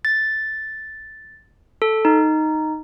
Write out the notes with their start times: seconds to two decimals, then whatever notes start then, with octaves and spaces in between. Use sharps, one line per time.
0.05 A6
1.82 A4
2.05 D#4